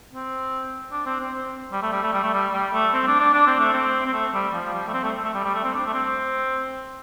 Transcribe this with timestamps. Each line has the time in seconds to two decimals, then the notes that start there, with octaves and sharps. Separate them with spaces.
0.13 C4
0.92 D4
1.06 C4
1.20 C4
1.72 G3
1.82 A3
1.92 G3
2.03 A3
2.13 G3
2.23 A3
2.34 G3
2.53 G3
2.73 A3
2.94 C4
3.07 D4
3.20 D4
3.34 D4
3.47 C4
3.60 A3
3.73 C4
4.06 C4
4.13 A3
4.34 G3
4.54 F3
4.73 G3
4.88 A3
4.93 C4
5.04 A3
5.24 A3
5.34 G3
5.44 G3
5.54 A3
5.64 C4
5.74 D4
5.87 A3
5.94 C4